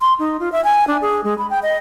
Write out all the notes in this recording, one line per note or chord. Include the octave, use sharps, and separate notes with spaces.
C6
D#4
F4
E5
G#5
D4
G#4
G#3
B5
G5
D#5